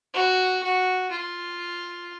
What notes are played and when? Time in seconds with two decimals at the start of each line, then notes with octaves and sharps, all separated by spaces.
0.14 F#4
0.63 F#4
1.11 F4